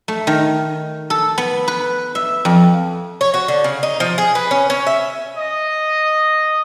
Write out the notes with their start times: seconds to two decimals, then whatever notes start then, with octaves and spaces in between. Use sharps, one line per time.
0.08 A3
0.27 D#3
1.10 A4
1.38 B3
1.68 B4
2.15 E5
2.45 F2
3.21 C#5
3.34 F#4
3.48 D3
3.64 C#3
3.83 D#4
4.00 F3
4.18 G#4
4.35 B4
4.51 C#4
4.70 C#4
4.87 E5
5.38 D#5